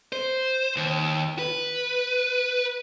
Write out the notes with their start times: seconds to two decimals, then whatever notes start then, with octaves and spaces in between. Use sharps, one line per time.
0.13 C5
0.76 D#2
1.39 B4